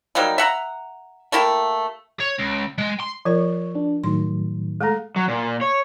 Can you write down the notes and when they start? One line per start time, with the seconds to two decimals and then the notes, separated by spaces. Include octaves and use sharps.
0.15 F#3 G3 A#3 D#4
0.38 E5 F#5 A#5
1.32 A3 A#3 E4 G4
2.20 C#5
2.39 C#2
2.78 G#3
3.00 C6
3.25 F3 F4 A#4 C#5
3.75 D4
4.04 A2 D#3 F#3 C6
4.81 G#3 A3 G#4 A4 A#5
5.16 F#3
5.28 A#2
5.61 C#5